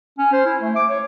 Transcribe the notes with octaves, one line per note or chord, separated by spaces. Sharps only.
C#4
C5
E4
A3
D6
C#5